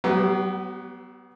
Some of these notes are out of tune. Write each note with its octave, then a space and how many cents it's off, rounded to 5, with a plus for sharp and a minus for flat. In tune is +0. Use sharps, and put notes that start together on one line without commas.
F#3 +40 B3 +0 G4 +0